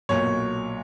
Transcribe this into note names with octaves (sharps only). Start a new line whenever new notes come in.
B1 A#2 F#3 C#5